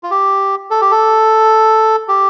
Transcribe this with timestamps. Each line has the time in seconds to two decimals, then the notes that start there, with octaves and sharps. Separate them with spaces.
0.03 F4
0.11 G4
0.71 A4
0.81 G4
0.91 A4
2.08 G4